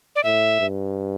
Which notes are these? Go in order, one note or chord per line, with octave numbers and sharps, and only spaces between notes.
D5
A2 E5
G2